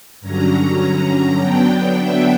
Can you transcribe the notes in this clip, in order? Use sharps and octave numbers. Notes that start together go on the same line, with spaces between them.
G2 D3 F#3 C#4 A#5
D3 F#3 B3 D4 G5
E5